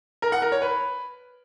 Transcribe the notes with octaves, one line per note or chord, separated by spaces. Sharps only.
A#4
F#5
A#4
C#5
B4